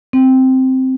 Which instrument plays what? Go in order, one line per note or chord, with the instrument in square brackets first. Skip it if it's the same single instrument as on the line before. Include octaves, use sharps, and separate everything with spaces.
[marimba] C4